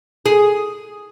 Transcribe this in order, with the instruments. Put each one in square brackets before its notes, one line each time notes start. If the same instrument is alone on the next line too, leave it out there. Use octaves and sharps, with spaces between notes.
[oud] G#4